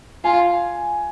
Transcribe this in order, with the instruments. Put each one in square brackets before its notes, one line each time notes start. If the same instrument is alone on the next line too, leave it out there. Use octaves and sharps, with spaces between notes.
[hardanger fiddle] F4 [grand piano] G#5